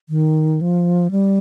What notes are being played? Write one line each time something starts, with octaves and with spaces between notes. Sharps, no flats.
D#3
F3
G3